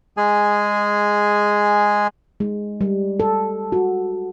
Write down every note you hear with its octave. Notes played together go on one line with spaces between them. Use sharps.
G#3 G#4 G#5
G#3
G3
A4
F#4